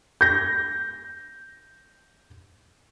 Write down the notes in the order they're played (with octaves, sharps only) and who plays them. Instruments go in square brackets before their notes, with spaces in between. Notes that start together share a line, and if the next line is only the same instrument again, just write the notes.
[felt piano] G6 A#6